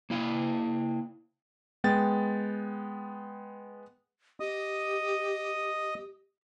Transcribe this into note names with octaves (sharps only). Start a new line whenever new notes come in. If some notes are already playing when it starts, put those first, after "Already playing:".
A#3 E4 F5
G#3 B3 G5 A6
G4 D#5 D#6